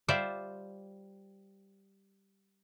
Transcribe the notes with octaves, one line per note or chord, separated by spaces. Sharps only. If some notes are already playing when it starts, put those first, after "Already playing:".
G3 F4 C5 D5 E5